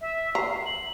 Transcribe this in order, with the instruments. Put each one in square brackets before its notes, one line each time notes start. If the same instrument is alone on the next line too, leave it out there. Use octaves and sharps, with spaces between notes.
[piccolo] E5
[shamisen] A#5 [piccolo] C7
[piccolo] F#7